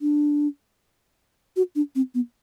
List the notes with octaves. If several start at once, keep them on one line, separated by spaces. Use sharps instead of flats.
D4
F#4
D4
C4
B3